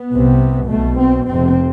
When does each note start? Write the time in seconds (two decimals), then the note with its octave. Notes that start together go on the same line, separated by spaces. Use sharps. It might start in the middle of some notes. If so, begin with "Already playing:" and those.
Already playing: B3
0.13 C2 C3
0.70 B1 B2 A3
0.98 C4
1.27 F1 F2 C3 C4